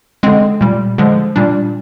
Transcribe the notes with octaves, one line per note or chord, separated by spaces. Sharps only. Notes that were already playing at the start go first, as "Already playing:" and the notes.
D3 G#3 C4
A#2 G3
D3 F3 G#3
A#2 G3 D4